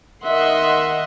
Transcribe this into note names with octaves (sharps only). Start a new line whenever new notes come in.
D#3 D#5 E5 F#5 C6